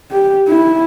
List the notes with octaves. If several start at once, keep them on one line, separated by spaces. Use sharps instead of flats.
G4
E4